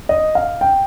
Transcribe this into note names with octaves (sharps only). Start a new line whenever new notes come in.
D#5
F5
G5